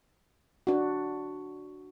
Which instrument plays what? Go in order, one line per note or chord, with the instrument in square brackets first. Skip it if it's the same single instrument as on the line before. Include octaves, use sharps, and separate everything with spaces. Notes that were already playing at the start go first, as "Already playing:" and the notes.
[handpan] D4 F#4